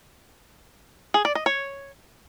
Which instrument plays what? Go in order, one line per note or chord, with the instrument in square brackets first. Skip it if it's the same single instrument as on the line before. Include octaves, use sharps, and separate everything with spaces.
[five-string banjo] G#4
D5
D#5
C#5